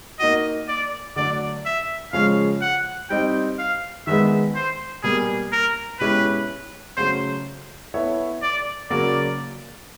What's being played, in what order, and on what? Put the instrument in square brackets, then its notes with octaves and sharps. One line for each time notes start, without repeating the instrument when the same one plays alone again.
[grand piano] A#3 D#4 F#4 [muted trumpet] D#5
[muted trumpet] D5
[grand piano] D3 F#3 A3 D4 [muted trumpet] D5
[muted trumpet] E5
[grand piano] C#3 F3 G#3 C#4 [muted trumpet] F5
[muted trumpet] F#5
[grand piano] G3 C4 D#4 [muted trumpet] G5
[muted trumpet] F5
[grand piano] D#3 G#3 B3 [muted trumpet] E5
[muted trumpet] C5
[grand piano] B2 G3 A#3 [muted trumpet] G#4
[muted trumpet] A#4
[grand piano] B2 G#3 C#4 E4 G4 [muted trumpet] B4
[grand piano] C#3 F#3 A3 C#4 [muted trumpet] C5
[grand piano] B3 E4 A4 C#5 E5
[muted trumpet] D5
[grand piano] C#3 F#3 A#3 [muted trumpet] D5